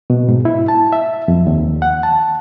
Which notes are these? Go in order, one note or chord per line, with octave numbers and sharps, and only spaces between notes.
B2
G#2
E4
A5
E5
F2
D#2
F#5
A5